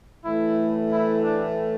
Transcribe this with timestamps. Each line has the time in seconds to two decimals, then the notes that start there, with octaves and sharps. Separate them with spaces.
0.25 A2 E3 A3 E4
0.90 E4
1.23 D4